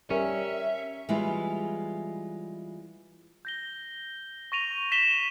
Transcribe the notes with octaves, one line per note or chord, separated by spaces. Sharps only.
G3 C#4 A#4 E5
E3 G3 G#3 B3 E4 F4
G6 A#6 G7
C#6 A#6 D#7 F7
B6 E7 G7